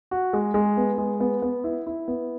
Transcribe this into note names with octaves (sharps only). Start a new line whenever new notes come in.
F#4
G#3
G#3
B3
G#3
B3
B3
E4
E4
B3